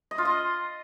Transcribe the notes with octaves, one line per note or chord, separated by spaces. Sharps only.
D#5
F4
D#5